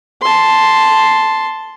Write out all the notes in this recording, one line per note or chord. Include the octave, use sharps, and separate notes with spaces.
A5 C6